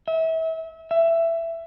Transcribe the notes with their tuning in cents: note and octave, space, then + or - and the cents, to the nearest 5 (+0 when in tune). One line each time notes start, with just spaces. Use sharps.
E5 -30
E5 +15